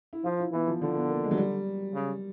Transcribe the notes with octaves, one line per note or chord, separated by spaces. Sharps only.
E4
F3 F4
E4
E3 B3
F3
D3 F3
B3
A#3
G#3
F#3
G3
C#3